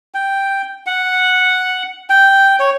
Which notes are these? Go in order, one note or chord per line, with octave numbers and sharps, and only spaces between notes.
G5
F#5
G5
C#5